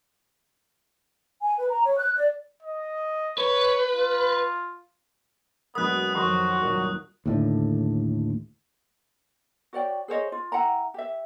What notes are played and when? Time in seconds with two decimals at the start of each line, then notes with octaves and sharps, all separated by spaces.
1.41 G#5
1.58 B4
1.70 A#5
1.84 C#5
1.99 F#6
2.15 D5
2.63 D#5
3.38 B4 C#5
3.95 F4
5.75 E1 B1 A#3 B3 D#6 F#6
6.15 F2 D#3 F3 F#3 F#4 C6
6.61 C2 G2 A#2 D#3 F#3 A#3
7.26 D#2 A2 D3
9.73 F#4 C#5 D5 G5
10.08 G#4 C5 C#5 D#5
10.32 F4
10.52 E4 F#5 G5 A#5
10.94 G4 E5